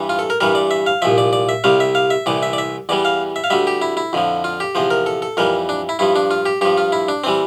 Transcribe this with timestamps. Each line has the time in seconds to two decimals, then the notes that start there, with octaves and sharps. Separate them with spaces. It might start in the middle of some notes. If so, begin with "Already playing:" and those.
Already playing: G2 E3 G3
0.09 F4
0.19 A4
0.30 A#4
0.41 G2 E3 G3 A#4
0.55 D5
0.71 E5
0.87 F5
1.02 C2 A#2 F3 E5
1.18 D5
1.33 D5
1.49 E5
1.64 C2 C3 G3 F5
1.80 E5
1.95 F5
2.10 E5
2.26 C2 C3 E3 D5
2.43 E5
2.53 D5
2.58 E5
2.89 E2 E3 G3 D5
3.05 F5
3.36 E5
3.44 F5
3.50 D2 D3 G3 E5
3.67 G4
3.82 E4
3.97 E4
4.13 F2 D3 F3
4.44 F4
4.60 G4
4.75 E2 C3 F3 C5
4.91 A#4
5.06 A4
5.22 A4
5.37 F2 E3 G3 A#4
5.69 D4
5.89 E4
5.99 G2 F3 E4
6.16 D4
6.31 F4
6.46 G4
6.61 G2 F3 G4
6.77 F4
6.92 E4
7.08 D4
7.24 E3 G3 C4